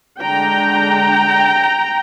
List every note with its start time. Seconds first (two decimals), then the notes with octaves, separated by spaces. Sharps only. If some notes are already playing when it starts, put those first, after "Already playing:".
0.21 D3 G#3 D4 G5 A#5